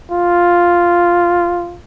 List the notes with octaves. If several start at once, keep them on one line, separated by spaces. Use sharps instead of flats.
F4